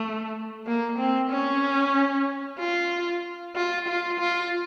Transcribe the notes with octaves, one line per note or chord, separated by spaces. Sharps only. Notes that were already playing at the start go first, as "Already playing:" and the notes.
Already playing: A3
A#3
C4
C#4
F4
F4
F4
F4